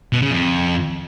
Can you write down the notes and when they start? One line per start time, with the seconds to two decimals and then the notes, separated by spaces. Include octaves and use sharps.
0.13 B2
0.22 C#3
0.31 F2